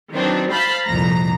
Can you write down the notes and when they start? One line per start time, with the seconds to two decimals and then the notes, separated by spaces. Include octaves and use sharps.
0.12 D#3 E3 F#3 C4 D4
0.51 C5 F5 A5 B5 G6
0.85 C2 F2 A#2 A#5 A#6